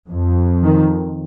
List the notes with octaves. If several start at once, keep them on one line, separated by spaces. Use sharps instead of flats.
F2
D#3